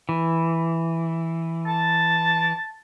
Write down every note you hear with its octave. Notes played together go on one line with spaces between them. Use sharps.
E3
A5